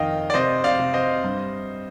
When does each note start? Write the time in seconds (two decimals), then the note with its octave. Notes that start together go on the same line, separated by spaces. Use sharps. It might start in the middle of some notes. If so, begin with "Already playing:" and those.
Already playing: F2 D#3 D#5 F5 G5
0.30 D5
0.34 C3 C5 D#5
0.64 D5 F5
0.79 C3
0.94 C5 D#5
1.24 G2